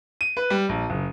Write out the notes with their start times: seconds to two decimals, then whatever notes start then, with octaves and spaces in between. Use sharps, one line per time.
0.21 D#7
0.37 B4
0.50 G3
0.69 A#1
0.90 F#1